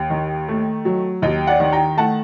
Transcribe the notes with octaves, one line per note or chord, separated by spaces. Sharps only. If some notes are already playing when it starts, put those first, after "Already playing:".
Already playing: D#2
D#3
A3
F#3
D#2 D#5 G5
D5 F#5
D#3
G5 A#5
A3 F#5 A5